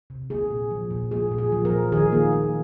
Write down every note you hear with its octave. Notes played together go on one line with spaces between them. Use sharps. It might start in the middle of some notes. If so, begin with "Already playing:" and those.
C3
A#3 G#4
A#2
F3
A#2
A#3 G#4
A#2
G#4
F3
A#4
A#2
D#3 G#4
A#3
A#3